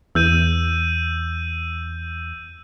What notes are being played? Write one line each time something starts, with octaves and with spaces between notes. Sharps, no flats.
E2 E6 G6 D#7